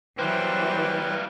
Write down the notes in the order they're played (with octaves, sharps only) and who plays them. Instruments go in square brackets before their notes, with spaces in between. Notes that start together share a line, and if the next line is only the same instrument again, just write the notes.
[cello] E3 F#3 [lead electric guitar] G3 A#3 [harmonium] B4 G5 [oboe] C5